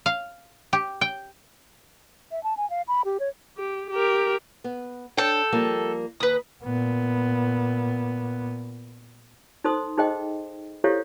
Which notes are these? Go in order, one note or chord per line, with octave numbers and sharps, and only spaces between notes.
F5
G4
G5
E5
A5
G#5
F5
B5
G4
C#5
G4
G4 A#4
B3
D4 A4 C#5 G5
F3 G3 A#3
D#2 B4 D#6
A#2 B3
D#4 A4 C5 C6 D#6
D#4 G#4 C5 D#5 G5
E4 G4 A4 C5 C#5 F5